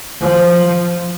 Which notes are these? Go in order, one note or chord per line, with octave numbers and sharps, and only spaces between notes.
F3